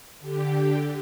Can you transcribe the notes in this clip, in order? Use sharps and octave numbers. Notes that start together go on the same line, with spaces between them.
D3 G4